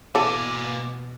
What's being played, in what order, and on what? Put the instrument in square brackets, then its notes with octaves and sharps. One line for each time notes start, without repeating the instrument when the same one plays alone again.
[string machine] B2 [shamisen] E3 A4 [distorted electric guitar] A#3 G#5 [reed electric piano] D6